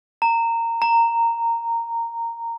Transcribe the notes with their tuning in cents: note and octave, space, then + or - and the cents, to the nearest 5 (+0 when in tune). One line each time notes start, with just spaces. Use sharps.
A#5 -20
A#5 -10